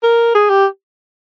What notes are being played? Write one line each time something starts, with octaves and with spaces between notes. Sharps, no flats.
A#4
G#4
G4